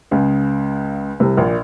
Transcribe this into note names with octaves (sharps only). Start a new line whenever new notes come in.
C#2 C#3
C2 C3
A#1 A#2